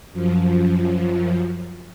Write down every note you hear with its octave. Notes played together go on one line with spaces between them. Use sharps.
F#2 F3